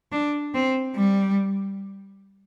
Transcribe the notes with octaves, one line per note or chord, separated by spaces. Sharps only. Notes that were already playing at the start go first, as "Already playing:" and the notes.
D4
C4
G3